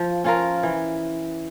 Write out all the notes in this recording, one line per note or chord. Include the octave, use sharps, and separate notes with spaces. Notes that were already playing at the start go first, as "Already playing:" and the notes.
Already playing: F3
C#4 F4 A#4
E3